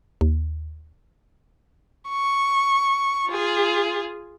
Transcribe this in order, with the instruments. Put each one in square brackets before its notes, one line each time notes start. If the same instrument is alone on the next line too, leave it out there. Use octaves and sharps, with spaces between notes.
[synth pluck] D#2
[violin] C#6
F4 G#4